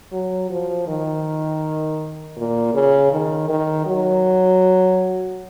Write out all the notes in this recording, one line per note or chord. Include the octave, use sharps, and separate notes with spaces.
F#3
F3
D#3
A#2
C#3
D#3
D#3
F#3